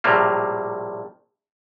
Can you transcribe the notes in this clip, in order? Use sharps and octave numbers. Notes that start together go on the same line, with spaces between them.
A#1 A2 C3 F#3 G3 A#3